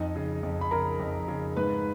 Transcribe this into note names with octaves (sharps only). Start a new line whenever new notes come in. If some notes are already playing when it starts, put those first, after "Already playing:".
Already playing: F2 D#4 D#5
C#3
F2
B5
C#3 A#4 A#5
F2
C#3
G#2 B4 B5